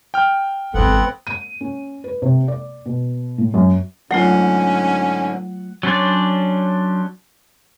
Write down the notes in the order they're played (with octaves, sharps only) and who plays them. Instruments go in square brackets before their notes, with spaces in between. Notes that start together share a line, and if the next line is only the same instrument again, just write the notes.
[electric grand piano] G5 F6
[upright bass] G#1 E2 [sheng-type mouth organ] B3 C4 F#5 [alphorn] A4
[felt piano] D#7
C#4
B4
C3
D5
B2
A2
F#2
[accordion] G#2 D3 [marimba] F#3 A3 F4 [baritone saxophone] C#4 [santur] F#5
[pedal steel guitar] F#3 C#4 D4 C5 D5